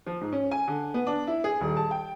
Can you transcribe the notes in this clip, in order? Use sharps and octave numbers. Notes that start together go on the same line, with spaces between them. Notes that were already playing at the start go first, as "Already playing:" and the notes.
F3
G#2
C#4
G#5
D3
B3
D4
E4
G#4
D#1
A5
G5